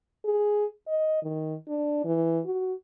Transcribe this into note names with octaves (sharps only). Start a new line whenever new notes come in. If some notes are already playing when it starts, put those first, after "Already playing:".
G#4
D#5
D#3
D4
E3
F#4